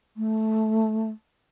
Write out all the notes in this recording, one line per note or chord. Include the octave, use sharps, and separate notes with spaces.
A3